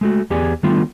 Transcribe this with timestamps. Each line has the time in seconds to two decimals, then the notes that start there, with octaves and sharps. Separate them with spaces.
0.01 G#3 A3 F#4
0.30 E2 B3 G4 G#4 D5 G#5
0.63 D#3 G3 A3 B3 D4 F4